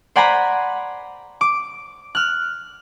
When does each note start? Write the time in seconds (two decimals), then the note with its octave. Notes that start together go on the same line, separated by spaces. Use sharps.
0.16 C5 D5 F#5 G#5 A#5 B5
1.41 D6
2.15 F6 F#6